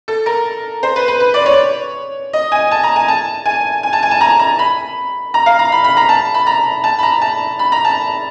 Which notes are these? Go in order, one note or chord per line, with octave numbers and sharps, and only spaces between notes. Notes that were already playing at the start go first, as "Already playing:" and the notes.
A4
A#4
C5
B4
B4
B4
D5
C#5
D#5
G#5
A5
A#5
G#5
A5
G#5
G#5
A5
G#5
A5
A#5
A#5
B5
A#5
F5
A#5
B5
B5
A#5
A5
B5
A#5
A5
B5
A#5
A5
B5
A#5
A5